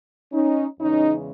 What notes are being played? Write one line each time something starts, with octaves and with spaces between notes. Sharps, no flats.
C#4 D#4
E2 C#3 E3 G#3 C#4 D#4